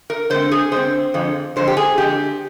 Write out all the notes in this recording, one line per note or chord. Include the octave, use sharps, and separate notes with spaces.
A#4
D3 G#3 C4 C5
G#4
D3 G#3 C4 C5
F2 D3 G#3
F2 D3 G#3 C5
G4
G#4
F2 D3 G#3 G4